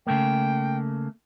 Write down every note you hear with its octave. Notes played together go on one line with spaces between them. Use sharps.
C#3 A3 A#3 G5